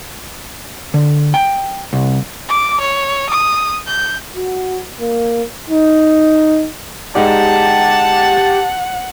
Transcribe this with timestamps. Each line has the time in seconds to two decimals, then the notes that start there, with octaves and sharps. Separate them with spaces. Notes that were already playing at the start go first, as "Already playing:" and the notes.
0.94 D3
1.34 G5
1.93 C2
2.48 D6
2.80 C#5
3.29 D#6
3.86 G6
4.36 F#4
5.00 A#3
5.69 D#4
7.15 G#3 D#4 G4 D5 F#5 A5